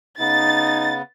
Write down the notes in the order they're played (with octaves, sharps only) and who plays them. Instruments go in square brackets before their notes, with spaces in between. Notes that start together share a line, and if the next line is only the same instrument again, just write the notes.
[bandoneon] C#3 B3 [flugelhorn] D#4 [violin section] A6